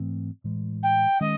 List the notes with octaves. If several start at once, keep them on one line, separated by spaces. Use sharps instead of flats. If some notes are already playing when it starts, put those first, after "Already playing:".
Already playing: G#2 E3 A3 C4
A2 E3 G#3
G5
D#3 G#3 C#4 D#5